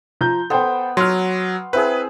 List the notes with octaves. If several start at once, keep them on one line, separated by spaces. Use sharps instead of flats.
F3 A#5 G6
B3 A4 C5 G5 B5
F#3 C6 F6
C4 E4 G#4 B4